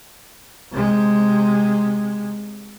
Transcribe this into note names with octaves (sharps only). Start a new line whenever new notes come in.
C3 G#3